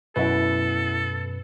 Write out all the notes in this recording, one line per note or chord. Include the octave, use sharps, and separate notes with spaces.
F#2 B2 B3 E4 A4 B4